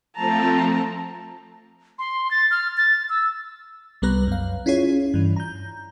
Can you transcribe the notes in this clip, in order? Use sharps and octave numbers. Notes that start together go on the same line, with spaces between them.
F3 A3 C4 A5 A#5
C6
A6
F6
A6
E6
C2 G3 B3 B4 A#5 F#6
F#2 F5
C#4 E4 F4 G#4 C#5
G2 E3
A#5 G6